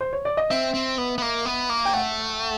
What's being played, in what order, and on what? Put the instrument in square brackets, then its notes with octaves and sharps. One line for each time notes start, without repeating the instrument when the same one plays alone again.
[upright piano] C5
C#5
D5
D#5
[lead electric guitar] C4 [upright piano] E5
[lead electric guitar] C4
B3
B3
A#3
B3
A#3
[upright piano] G5
[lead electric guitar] A3 [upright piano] F#5